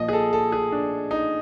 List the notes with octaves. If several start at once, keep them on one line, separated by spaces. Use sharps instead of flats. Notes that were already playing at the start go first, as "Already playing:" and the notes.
Already playing: A#2 F3 D#5
G#4
A4
A4
G#4
D4
D#4